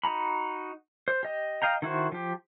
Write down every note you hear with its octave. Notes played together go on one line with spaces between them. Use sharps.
D#4 F#4 A#5 B5
C5
G4 D#5
D#5 F5 G5 A#5
D#3 E4 F#4 C5
F3 G4